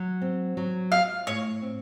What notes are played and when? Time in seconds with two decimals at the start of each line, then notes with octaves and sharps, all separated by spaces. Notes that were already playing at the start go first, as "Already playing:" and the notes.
Already playing: F#3
0.22 C4
0.57 F#3
0.92 F4 F5
1.27 A2 C#5
1.62 C4